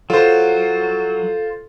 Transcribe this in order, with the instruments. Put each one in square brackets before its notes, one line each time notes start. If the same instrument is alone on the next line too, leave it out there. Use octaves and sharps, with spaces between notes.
[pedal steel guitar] F#3 [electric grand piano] F4 C5 [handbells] A4